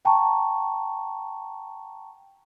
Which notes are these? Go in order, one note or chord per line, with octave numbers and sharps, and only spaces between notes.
F#5 G5 A5 A#5 C#6